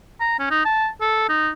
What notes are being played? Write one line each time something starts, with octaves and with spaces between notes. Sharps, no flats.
A#5
C#4
D#4
A5
A4
D#4